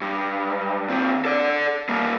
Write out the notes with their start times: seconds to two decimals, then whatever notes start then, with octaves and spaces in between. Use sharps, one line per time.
0.01 G2
0.89 D#2 C4
1.25 A4 D5
1.89 G3 A#3